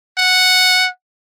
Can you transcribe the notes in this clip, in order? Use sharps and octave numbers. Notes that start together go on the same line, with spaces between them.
F#5